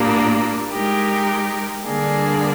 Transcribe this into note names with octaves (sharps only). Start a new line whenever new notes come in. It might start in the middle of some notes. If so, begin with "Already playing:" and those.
Already playing: A#2 G3 A#3 D4
G#3 D#4 G4 A#4
D3 G3 A#3 D4 G#4